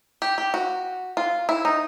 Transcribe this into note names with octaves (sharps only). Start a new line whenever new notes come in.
G4
G4
F#4
F4
E4
D#4